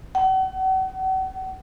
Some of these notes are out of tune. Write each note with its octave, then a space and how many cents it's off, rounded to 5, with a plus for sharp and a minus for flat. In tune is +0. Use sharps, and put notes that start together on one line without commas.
F#5 +40